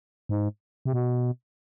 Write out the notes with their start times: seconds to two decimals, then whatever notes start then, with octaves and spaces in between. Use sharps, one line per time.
0.29 G#2
0.85 C3
0.93 B2